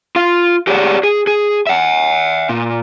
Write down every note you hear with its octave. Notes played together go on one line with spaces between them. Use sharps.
F4 F5
G4 G#4 C#5 D5 F5 F#5
G#4
G#4
E5 F#5
A#2